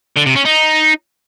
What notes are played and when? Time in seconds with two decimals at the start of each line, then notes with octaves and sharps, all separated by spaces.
0.17 D3
0.27 C3
0.36 C#4
0.46 D#4